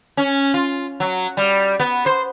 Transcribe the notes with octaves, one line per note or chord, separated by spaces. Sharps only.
C#4
F4
F#3
G3
B3
C5